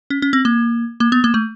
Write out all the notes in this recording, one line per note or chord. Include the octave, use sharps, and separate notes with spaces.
C#4
C#4
C4
A#3
A#3
B3
A#3
A3